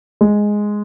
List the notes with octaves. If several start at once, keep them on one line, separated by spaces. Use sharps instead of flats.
G#3